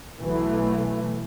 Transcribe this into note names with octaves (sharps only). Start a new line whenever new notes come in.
B1 B2 E3 A3